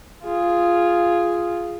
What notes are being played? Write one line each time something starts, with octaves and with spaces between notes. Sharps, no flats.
F4 G#4